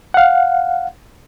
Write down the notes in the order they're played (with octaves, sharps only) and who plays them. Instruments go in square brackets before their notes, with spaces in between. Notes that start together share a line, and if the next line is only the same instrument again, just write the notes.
[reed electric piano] F5 F#5